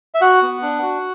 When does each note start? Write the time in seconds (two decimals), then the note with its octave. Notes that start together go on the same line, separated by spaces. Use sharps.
0.14 E5
0.21 F#4 F#5
0.43 B3
0.62 D4
0.83 F#4